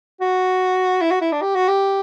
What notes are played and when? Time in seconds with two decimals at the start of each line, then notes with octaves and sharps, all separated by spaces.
0.21 F#4
1.01 E4
1.11 F#4
1.21 E4
1.32 D4
1.42 G4
1.55 F#4
1.68 G4